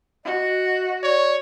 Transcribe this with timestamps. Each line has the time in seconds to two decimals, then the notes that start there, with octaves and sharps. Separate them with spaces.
0.25 F#4 D#5
1.03 C#5 D5